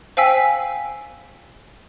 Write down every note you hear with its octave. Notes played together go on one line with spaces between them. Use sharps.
C5 F5 G5 G#5 E6 B6